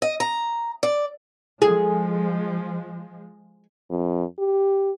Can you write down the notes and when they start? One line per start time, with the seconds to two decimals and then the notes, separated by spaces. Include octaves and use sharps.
0.02 D#5
0.20 A#5
0.83 D5
1.62 F3 G#3 G#4
3.90 F2
4.38 G4